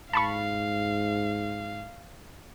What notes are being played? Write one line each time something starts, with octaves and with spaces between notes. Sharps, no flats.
G#2 F5 A5 B5 C#6